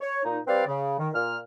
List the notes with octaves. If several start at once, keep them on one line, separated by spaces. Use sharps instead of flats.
C#5
A#2 D#4
G3 C4 B4 D5 F5
C#3
D#3
A#2 F6